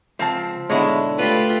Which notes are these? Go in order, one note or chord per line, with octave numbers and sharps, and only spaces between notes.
C#2 F3 C4 A5
G#2 B2 D3 G#3 D4 E4 C#5
A3 F4 G4 B4